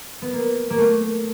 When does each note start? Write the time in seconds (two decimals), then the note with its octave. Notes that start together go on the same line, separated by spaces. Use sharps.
0.22 B3
0.33 A#3
0.70 A#3
0.78 A3